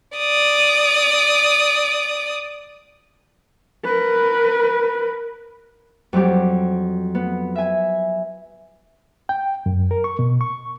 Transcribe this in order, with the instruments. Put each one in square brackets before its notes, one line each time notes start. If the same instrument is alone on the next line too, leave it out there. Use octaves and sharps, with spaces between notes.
[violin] D5 D#6
[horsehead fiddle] A#4 B4
[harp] F2 F#3 G3 G4
B3
E5 G#5
[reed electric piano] G5
F#2
A#4
C#6
B2
C#6